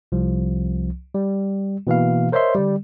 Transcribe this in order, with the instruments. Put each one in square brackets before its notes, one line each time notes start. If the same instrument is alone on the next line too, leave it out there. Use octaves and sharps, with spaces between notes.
[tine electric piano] C2 F3
G3
B2 E3 A#3 F5
A#4 C5 C#5 D#5 E5 C6
D3 G3